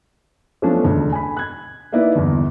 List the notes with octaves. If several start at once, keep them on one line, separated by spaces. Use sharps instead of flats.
F3 F#3 A3 B3 C#4 D4
E1 D2 D3
G#5 B5
F#6 G#6
A#3 D#4 E4 B4 D5 E5
G1 E2